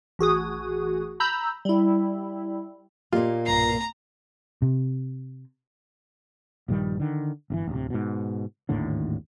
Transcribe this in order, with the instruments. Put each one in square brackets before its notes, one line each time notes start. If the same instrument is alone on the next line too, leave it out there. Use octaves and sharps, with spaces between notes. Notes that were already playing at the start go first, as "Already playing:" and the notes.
[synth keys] A1 F#4 G#4 D#6
A#5 B5 E6 G6
G3 E4
[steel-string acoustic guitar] A#2 A#3 [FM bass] F4 [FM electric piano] G4 D#5
[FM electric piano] B1 G2 C7 [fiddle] A#5
[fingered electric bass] C3
[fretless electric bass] A#1 G2 D#3 G3
D3 D#3
G1 C3 E3
D1 C3
G#2 B2
G#1 D#2 A2 D3